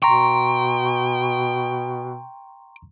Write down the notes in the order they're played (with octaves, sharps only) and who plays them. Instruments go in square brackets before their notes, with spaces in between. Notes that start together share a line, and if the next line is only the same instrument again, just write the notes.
[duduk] B2 [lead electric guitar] G5 [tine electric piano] A#5 C6 C#6